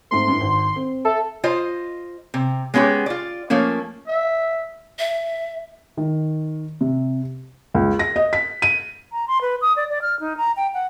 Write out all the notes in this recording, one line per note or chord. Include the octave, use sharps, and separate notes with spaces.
G#2 A3 C4 C6
G2 E4
G#1
C4
A4 E5
F4 C5 D#5
C3
G#3 B3 C#4 F#4 G4
F4 D5
F3 A3 A#3 C#4
E5
E5
D#3
C3
C#2
A#6
D#5
B6
D#7
A#5
C6
B4
D#6
D5
D5
F6
D#4
A#5
G5
F#5